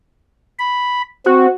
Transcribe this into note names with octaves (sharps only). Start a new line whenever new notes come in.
B5
C4 F#4